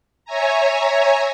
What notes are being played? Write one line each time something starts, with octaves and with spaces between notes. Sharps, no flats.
C#5 E5 G#5 A#5